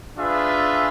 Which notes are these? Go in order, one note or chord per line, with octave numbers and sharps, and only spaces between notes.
D4 F4 G#4 B4 E5